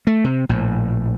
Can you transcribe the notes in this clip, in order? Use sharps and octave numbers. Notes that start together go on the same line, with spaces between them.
A3
C3
A#1 A2